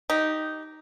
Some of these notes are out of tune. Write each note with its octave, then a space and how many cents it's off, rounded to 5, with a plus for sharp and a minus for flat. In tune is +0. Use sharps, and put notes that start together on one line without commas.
D#4 +0 G4 -10